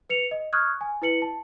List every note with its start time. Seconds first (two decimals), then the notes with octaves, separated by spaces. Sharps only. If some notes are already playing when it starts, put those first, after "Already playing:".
0.09 B4 C#7 F7
0.31 D#5
0.53 C#6 D#6 F6 F#6 G#6
0.81 G#5
1.02 E4 B4 C#7 F#7
1.22 A5